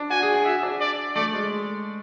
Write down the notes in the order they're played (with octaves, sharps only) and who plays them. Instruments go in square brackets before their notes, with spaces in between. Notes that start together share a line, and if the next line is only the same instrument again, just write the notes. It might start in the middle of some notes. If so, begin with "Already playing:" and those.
Already playing: [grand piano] D4
[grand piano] F#4 [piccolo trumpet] G#5
[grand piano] G#4
G#4
[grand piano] F#4 [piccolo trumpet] E5
[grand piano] D4
[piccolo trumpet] D5
[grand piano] A3 [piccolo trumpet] D5
[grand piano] G#3